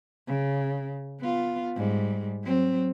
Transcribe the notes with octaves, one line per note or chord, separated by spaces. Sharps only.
C#3
B3 F4
G#2 G3
F#3 C4